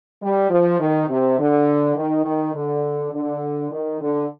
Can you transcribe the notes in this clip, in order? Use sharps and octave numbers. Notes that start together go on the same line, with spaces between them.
G3
F3
D#3
C3
D3
D#3
D#3
D3
D3
D#3
D3